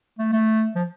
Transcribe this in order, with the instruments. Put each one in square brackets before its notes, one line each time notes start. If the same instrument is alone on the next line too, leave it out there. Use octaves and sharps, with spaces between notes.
[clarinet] A3
A3
F3